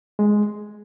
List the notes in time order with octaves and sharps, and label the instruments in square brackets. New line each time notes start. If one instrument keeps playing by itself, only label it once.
[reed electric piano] G#3